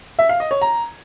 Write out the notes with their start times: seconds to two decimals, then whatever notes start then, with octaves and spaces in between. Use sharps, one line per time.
0.19 E5
0.29 F5
0.40 D#5
0.51 C#5
0.62 A#5